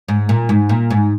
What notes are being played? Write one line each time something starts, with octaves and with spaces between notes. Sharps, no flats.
G#2
A#2
G#2
A#2
G#2